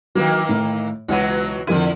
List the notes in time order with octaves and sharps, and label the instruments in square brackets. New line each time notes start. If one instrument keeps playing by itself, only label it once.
[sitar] D#3 E3 A#3 [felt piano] F#3
[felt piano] A2
[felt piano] C#2 F#5 D#7 [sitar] B2 E3 F#3
[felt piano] F2 A#4 D#7 [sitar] D3 E4